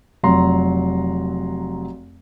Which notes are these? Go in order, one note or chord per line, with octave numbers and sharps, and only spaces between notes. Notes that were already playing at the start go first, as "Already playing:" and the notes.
F1 F#3 A#5 C6